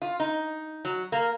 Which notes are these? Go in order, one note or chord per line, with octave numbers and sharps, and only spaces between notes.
F4
D#4
F#3
A#3